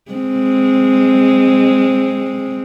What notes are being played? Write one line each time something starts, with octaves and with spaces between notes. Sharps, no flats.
G#3 C4